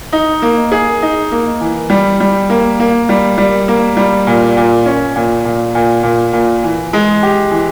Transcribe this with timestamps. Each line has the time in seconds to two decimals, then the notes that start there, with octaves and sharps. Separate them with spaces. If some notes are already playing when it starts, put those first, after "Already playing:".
0.13 D#4
0.42 A#3
0.72 G#4
1.02 D#4
1.32 A#3
1.61 E3
1.90 G3
2.20 G3
2.50 A#3
2.80 A#3
3.09 G3
3.38 G3
3.68 A#3
3.97 G3
4.27 A#2
4.57 A#2
4.86 C#4
5.16 A#2
5.45 A#2
5.75 A#2
6.03 A#2
6.33 A#2
6.64 E3
6.93 G#3
7.23 G4
7.51 E3